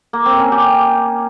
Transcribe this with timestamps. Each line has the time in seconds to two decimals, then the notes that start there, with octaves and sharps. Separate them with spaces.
0.13 A#3
0.26 C4
0.39 C#4
0.52 G4